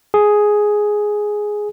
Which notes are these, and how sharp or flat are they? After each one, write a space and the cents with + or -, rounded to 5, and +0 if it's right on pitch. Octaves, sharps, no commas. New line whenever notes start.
G#4 +5